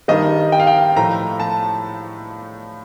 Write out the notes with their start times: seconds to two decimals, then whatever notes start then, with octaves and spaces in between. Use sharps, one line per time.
0.08 G2 D#3 G3 D#5
0.52 G5
0.60 F5
0.67 G5
0.96 A2 F3 A3 A#5
1.40 A5